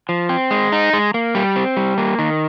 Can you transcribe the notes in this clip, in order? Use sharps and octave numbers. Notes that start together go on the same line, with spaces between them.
F3
C4
G#3
D#4
G#3
A#3
G3
C4
G3
A#3
D#3